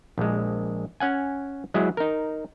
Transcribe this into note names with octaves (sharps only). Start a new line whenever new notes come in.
A#1 G#3
C#4 F#5 G#5
F#3 G#3 E4 G#4
D#4 A#4